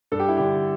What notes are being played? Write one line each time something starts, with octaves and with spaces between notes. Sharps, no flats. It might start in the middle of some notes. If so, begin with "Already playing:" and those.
G2 A4
G4
E4
D3 G4